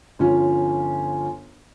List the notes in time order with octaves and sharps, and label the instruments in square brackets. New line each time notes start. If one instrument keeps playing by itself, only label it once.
[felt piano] G1 F3 C#4